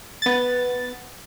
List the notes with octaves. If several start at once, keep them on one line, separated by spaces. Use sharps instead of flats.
B3 A6